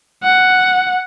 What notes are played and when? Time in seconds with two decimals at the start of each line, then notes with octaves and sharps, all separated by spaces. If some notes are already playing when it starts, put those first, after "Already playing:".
0.23 F#5